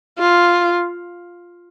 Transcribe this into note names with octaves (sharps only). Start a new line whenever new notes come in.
F4